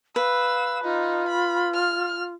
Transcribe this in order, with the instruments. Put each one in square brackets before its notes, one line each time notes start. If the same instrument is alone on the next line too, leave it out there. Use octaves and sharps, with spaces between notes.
[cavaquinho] B4 [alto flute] F5 [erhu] E6
[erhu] D#4 [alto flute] F4
[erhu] B5
F6